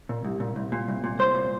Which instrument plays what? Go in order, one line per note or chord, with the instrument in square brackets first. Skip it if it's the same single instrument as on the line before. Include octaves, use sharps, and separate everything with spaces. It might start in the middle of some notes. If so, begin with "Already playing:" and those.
[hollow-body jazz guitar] A#2
C2
A#2
C2
A#2
C2
A#2
C2 C5
A#2